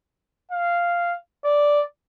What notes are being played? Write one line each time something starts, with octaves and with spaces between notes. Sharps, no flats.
F5
D5